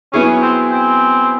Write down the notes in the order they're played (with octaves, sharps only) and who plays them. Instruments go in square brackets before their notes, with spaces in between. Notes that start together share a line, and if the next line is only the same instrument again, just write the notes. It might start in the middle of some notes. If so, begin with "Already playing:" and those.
[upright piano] F#3 B3 E4 G#4 [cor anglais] C#4
[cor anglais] C4
C4